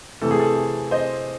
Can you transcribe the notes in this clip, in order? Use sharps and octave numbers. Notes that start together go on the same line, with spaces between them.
C3 E3 A3 A4
G#4
A4
C5 D#5